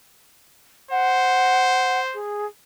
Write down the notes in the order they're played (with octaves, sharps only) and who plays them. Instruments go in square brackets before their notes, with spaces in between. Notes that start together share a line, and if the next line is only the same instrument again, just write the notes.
[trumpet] C5 [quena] F#5
[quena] G#4